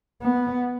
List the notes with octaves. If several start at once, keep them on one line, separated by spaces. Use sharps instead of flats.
B3